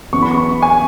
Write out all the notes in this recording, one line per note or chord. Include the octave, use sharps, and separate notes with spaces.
F#2 E3 B3 C#6
B5
C#6
G#5